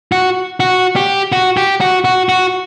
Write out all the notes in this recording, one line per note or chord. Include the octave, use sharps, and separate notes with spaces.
F#4
F#4
G4
F#4
G4
F#4
F#4
F#4